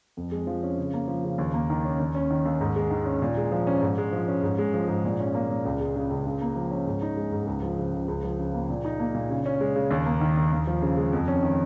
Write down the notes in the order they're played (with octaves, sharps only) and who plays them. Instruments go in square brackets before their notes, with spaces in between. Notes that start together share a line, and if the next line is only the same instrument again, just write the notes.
[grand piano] F2
G#3
F3
C#4
C#3
A#3
F3
C#3
D#2
A#3
D#3
C#4
D#2
C#4
D#3
D#2
G#2
G#3
D#3
C#4
A#2
G#3
F3
C#4
G#2
G#3
F3
C#4
G#2
G#3
F3
G#2
A#2
C#4
A#3
A#2
C#2
G#3
C#3
C#2
C#3
A#3
F3
C#4
G#2
D#4
G#3
G#2
C#2
F3
C#3
C#2
C#2
F3
C#3
A#3
A#2
D#4
A#3
A#2
C#3
C#4
G#3
C#3
D#2
A#3
D#3
D#2
D#2
F3
C#3
G#3
F2
C#4
D#3